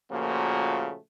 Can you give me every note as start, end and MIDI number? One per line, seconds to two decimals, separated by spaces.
0.11 0.97 46
0.11 0.97 49
0.11 0.97 53
0.11 0.97 57
0.11 0.97 58
0.11 0.97 66